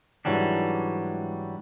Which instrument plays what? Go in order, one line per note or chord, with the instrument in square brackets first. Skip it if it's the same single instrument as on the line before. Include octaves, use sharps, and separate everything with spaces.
[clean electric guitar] G#2 E3 F#3 G3 D4